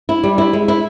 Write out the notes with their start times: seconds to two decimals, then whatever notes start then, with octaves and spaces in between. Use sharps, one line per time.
0.09 E4
0.24 G3
0.38 E4
0.53 G#3
0.68 E4